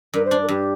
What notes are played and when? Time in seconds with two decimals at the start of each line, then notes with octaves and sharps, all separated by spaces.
0.14 G2 A#4
0.25 C5
0.31 D4
0.43 A#4
0.48 G2 G4